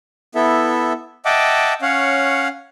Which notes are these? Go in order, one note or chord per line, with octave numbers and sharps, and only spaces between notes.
B3 E4 A4 E5
D#5 E5 F#5 G5 A5 D6
C#4 C#5 F5 F#5